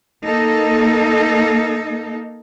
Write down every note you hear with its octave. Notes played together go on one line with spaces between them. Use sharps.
A#3 D#4 A4